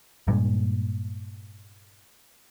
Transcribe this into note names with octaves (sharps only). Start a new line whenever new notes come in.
G2 A#2 G3 G#3